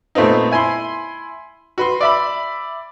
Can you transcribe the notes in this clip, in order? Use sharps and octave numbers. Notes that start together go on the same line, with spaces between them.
A#2 A3 B3 C4 D#4
E4 G#5 B5 C6
F#4 B4 C6
D5 E5 B5